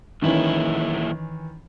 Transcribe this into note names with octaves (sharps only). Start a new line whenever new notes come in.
F#2 A#2 D#3 E3 C#4 E4